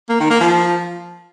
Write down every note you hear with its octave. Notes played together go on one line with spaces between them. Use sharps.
A#3
D#3
A#3
F3